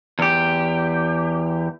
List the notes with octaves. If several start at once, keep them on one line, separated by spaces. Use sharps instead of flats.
E2 G4